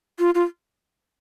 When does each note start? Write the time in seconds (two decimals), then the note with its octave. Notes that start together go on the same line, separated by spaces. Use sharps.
0.19 F4
0.35 F4